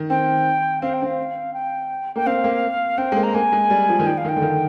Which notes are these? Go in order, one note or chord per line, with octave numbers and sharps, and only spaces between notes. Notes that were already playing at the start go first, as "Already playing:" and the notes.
Already playing: D#3
C4 G5
C4 F5
G5
C4 F5
G5
A#3 G5
C4 F5
A#3
C4 G5
G#3
A#3
A#5
A#3 G#5
G#3
G3
F3
D#3
F3 G5
F5
D#3
G5
D3
D#3